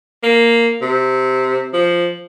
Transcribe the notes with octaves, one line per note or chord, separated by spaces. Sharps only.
A#3
C3
F3